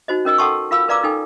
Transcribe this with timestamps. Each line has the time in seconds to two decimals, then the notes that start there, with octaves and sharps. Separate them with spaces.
0.08 D#4 F#4 C5 D#5
0.25 C#4 A#4 D#5 E6
0.38 A4 F#5 G5 A5 C6 C#6
0.71 F4 A#4 F5 B5 E6
0.88 A#4 B4 D5 F5 A#5 D6
1.04 D#4 A4 G5 G#5